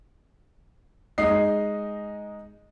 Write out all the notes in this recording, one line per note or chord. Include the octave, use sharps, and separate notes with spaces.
G#3 D#4 D#5 C7